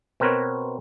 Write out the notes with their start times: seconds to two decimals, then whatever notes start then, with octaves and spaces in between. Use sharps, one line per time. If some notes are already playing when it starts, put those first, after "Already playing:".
0.20 B2 C4 A#4 B4 C#5